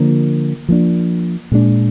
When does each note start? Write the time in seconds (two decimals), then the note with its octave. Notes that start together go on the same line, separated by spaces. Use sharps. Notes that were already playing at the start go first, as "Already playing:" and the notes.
Already playing: D3 F3 A#3 D4
0.69 F3 A#3 D4
1.52 A#2 G#3 D4